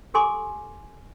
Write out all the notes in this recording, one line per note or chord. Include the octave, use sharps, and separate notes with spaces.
G4 A4 G#5 C6 D6